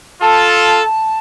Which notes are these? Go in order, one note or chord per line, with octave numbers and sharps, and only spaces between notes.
F4 A4 A5